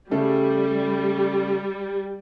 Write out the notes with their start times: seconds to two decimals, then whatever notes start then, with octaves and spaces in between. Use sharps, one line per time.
0.11 C#3 G3 A3 A4